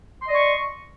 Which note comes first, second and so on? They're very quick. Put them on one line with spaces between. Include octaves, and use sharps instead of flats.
C6 D#5 D5 C#6